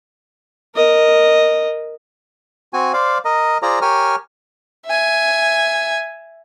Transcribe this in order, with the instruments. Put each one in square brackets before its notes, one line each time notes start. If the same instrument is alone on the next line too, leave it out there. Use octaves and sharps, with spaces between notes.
[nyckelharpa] A#4 D#5
[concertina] C4 F#4 G#5
C5 D5 F5
A#4 D#5
F4 G#4 C5 D5 A#5
G4 A#4 C#5 G#5 F6
[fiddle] E5 G#5